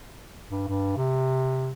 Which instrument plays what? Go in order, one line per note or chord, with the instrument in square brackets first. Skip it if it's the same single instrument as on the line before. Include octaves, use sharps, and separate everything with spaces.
[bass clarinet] G2
G2
C3